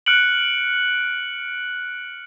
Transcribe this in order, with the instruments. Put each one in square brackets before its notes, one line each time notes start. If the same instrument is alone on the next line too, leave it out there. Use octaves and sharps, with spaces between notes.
[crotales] F6 F#6 C#7 D7 F#7